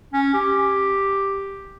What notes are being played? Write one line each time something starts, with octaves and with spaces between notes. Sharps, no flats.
C#4
G4